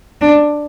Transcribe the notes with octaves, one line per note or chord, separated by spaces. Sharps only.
D4